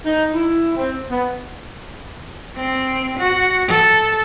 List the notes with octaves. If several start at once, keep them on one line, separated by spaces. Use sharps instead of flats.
D#4
E4
C4
B3
C4
F#4
A4